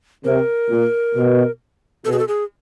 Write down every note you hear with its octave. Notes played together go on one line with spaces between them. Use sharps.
C3 A#4
A#2
B2
B2 A4
G#4
A4
G#4